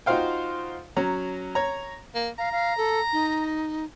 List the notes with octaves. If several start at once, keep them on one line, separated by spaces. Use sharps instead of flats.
D#4 F4 F#4 C5 F5 G5
F#3 C#4 A#5
C#5 A#5
A#3
F5 A#5
F5
A4
D#4